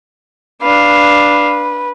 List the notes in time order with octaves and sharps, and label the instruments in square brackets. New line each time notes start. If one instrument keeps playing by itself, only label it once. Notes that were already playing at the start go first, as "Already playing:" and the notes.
[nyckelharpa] D4 F5 [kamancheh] B4